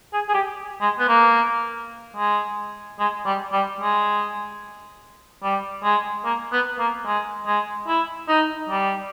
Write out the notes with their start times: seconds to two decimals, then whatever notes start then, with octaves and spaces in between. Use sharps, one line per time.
0.13 G#4
0.29 G#4
0.34 G4
0.81 G#3
0.99 B3
1.08 A#3
2.17 G#3
2.99 G#3
3.26 G3
3.53 G3
3.80 G#3
5.43 G3
5.84 G#3
6.25 A#3
6.52 B3
6.79 A#3
7.06 G#3
7.47 G#3
7.88 E4
8.29 D#4
8.69 G3